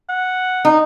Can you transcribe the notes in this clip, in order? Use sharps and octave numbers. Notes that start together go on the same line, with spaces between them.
F#5
D#4